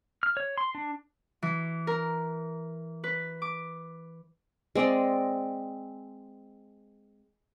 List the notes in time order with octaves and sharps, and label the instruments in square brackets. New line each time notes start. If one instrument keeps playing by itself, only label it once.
[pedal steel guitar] F6
C#5
C6
D4
[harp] E3
A#4
B4
D6
[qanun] G#3 C4 D5 D#5